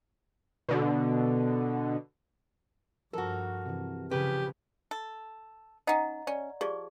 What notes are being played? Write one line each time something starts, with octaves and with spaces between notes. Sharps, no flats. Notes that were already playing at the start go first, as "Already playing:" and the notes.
B2 D3
G2 F3 F#4 A4 A#4
C3 E3
C#3 F3 G4 B4
A4
C#4 D#4 D#5 F#5 A#5
C#4 D5
F3 G4 G#4 D5